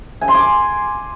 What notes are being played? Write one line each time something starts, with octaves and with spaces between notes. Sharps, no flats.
G#5
C6
D6